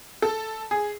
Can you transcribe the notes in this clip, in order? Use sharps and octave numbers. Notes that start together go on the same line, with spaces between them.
A4
G#4